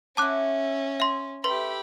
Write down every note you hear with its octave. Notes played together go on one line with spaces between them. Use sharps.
C#4 E4 F#4 A5 D6 F#6
E5 C6
A3 G4 B4 B5 C6